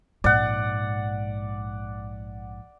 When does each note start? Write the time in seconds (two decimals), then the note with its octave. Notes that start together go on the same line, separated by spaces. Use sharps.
0.24 A#1 G#2 D5 F#5